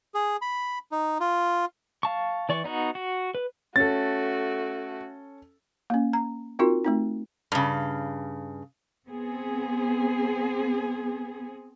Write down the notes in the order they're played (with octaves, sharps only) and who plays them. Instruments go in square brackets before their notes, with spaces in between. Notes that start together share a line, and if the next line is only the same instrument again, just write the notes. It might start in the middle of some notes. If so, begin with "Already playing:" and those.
[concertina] G#4
B5
D#4
F4
[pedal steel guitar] F5 A5 C#6
E3 D5 C#6
B3 D#4 F#4
F#4
B4
[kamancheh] A3 F#4 [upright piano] C#4 A4 [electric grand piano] A6
[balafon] A#3 C#4
A#5
C4 D#4 F4 F#4 A#4
A3 C4 D#4
[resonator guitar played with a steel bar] G2 C#3
[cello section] B3 C4 G#4